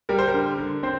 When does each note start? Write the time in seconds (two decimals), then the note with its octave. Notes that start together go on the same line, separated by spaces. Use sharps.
0.09 G3 A#4
0.19 C5
0.28 A#4
0.34 D3
0.58 D3
0.83 C4 C5